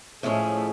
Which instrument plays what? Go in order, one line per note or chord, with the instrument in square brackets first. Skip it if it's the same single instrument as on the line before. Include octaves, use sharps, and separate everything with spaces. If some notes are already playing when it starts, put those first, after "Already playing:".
[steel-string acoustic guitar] A2 F3 G#3 C#4 [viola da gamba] A3